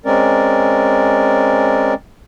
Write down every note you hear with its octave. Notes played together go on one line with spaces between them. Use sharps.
G#3 C4 C#4 A#4 D5